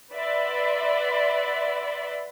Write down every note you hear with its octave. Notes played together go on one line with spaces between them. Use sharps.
B4 D5 E5 F#5 B5 C6